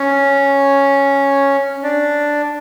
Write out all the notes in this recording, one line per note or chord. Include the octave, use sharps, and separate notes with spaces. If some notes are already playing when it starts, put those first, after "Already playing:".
Already playing: C#4
D4